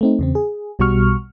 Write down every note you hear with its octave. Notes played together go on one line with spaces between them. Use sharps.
A3 C4 D#4
E2 C#3 C4
G#4
B1 B2 G3 F#4 C#6 F6